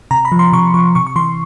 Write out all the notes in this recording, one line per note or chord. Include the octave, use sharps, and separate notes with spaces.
C3 A#5
B5
F3
C6
C3 C#6
F3 C#6
C3 C#6
C#6
E3 C6